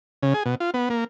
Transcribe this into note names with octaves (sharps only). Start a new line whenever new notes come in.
C#3
G#4
B2
F4
B3
A#3